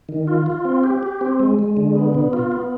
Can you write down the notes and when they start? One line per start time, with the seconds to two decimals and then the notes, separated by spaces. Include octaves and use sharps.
0.09 D#3
0.27 F4
0.46 F4
0.65 C4
0.84 G4
1.03 G4
1.21 C4
1.40 G#3
1.59 G#3
1.77 D3
1.95 B3
2.14 B2
2.33 F4
2.52 B3